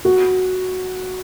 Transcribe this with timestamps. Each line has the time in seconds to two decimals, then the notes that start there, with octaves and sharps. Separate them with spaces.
0.05 F#4